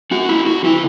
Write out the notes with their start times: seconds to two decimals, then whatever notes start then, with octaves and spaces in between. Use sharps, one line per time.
0.11 C#4 F#4
0.29 C#4 E4
0.46 D3 F#4
0.64 D3 E4